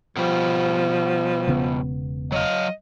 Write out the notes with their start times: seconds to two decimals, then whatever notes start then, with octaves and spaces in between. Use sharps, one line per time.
0.17 B2 F3 G3
1.47 E1 C#3 B3
2.32 F#3 D#5 F5